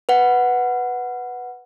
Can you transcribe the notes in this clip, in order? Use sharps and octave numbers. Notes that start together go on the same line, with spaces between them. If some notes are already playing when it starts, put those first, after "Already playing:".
B4 F#5